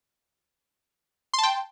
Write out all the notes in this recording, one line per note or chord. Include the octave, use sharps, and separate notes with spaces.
G5 A5 C6